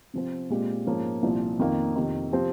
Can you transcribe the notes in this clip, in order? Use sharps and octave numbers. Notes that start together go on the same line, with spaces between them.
C3 F3 C4
A#2 G#3 C4 G4
G#2 F3 A#3 C#4
C2 A#2 F3 C4
F2 D#3 A#3
F2 C3 D#3
C3 F3 C4 G4